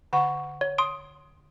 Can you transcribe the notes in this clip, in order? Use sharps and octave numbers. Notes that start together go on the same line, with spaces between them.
D3 F#5 C#6
C#5
C6 D#6 D7